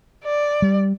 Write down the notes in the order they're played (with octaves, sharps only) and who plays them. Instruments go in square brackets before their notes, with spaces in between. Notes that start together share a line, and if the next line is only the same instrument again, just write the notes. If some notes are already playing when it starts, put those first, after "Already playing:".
[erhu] D5
[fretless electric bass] G3